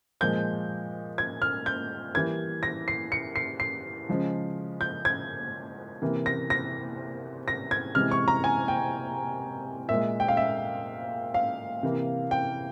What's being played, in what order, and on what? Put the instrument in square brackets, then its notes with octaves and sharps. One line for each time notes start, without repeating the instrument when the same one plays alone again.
[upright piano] A#2 F3 G#3 G6
G#6
F6
G6
E3 G3 A#3 G#6
A#6
C7
C#7
C7
C7
C#3 F3 G#3
G6
G#6
C3 E3 A#3
A#6
A#6
A#6
G#6
C3 E3 G#3 F6
C#6
A#5
G#5
G5
A#2 G#3 E5
G5
F5
E5
F5
C3 E3 A#3
G5